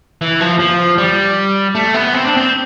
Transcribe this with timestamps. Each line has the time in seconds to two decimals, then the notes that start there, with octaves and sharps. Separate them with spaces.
0.22 E3
0.41 F3
0.59 F3
0.98 G3
1.75 A3
1.94 B3
2.14 C4
2.25 D4
2.37 C4